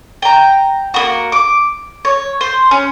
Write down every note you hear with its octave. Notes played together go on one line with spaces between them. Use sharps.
G5 A#5
A#3 B3 F#4
D6
C#5
C5
C#4